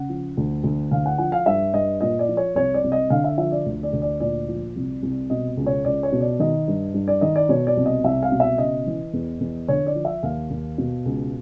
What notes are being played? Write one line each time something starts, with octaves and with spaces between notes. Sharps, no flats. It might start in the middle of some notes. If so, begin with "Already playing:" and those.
Already playing: C#3 F#5
F3
D2
D2
D3 F5
F#5
F3 F#5
F5
G2 E5
G2 D#5
A#2 D#5
D5
F3
C#5
C2 C#5
D5
C2
D#5
D3 F5
E5
F3 E5
D5
D2
D5
D2
D5
A#2 D5
F3
C2
C2
B2 D#5
C#2
C#5
C#2 D5
C#5
B2
D5
D#3 D#5
G2
G2
D5
D#3 D#5
D5
B2 C#5
D5
C2
D#5
C2 E5
F5
B2
E5
C#3 D#5
E3
E2
E2
D3 C#5
D5
F3
E5
D#2 F5
D#2
B2
C#2